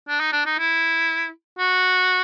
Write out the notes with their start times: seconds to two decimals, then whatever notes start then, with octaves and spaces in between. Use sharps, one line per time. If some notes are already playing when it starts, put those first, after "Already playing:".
0.08 D4
0.20 D#4
0.32 D4
0.46 D#4
0.59 E4
1.58 F#4